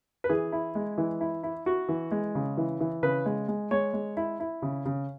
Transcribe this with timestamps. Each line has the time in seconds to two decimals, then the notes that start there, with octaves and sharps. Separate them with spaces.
0.24 B4
0.29 E3 G#4
0.52 E4
0.75 G#3
0.98 E3
1.21 E4
1.43 E4
1.66 E4 F#4
1.89 E3
2.12 G#3
2.35 C#3
2.57 E3
2.80 E3
3.03 C#3 B4
3.26 G#3
3.48 G#3
3.71 G#3 C#5
3.93 G#3
4.17 E4
4.40 E4
4.62 C#3
4.86 C#3